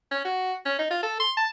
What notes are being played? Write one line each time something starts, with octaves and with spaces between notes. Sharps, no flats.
C#4
F#4
C#4
D#4
F4
A4
C6
A5